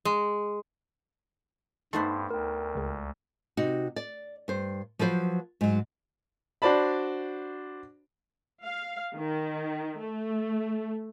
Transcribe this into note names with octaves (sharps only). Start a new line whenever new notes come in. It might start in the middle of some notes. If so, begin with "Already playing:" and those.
G#3
G2 A3 B3 D#4 C5 C6
D2 A#4 G5
C#2 G#3
C3 D#4 F#4
D5
G2 C5
F3 F#3 B4 C5
G#2 F#3
D4 F#4 C5 D5 A5 B5
F5
D#3
A3